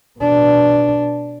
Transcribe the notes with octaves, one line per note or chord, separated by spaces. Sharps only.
B2 D4